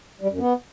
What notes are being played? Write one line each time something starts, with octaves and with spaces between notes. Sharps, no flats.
G3
F#2
B3